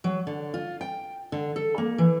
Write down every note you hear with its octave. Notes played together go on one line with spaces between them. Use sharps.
F#3
D3
F4
G5
D3
A4
A#3
E3